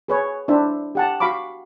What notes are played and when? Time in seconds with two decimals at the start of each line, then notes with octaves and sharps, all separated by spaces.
0.08 G#4 B4 C#5
0.48 D4 E4 C5 E5
0.95 G4 F#5 A5
1.20 F#4 F5 B5 C#6 D6